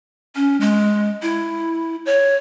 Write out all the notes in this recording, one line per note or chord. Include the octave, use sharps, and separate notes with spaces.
C#4
G#3
E4
C#5